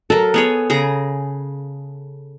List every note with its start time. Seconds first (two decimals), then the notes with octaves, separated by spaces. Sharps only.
0.10 F#3 A4 A#4
0.34 B3 G#4 C#5
0.70 C#3 G#4 A#5